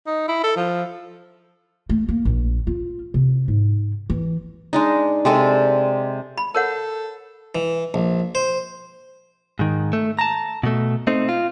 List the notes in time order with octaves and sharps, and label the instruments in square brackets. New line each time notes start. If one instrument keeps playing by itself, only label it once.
[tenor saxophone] D#4
E4
A4
F3
[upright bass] A3
A#3
A#1
F4
C3
G#2
E3
[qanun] G#3 D4 D#4
C3 G#3 A4 D5
[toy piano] B5
[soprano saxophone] A4 [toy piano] A#4 C#5 F#5
[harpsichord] E3
A#1
C5
[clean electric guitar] G#2 D#3
A3
A5 A#5
B2 A3
A3 C4 D#4
F4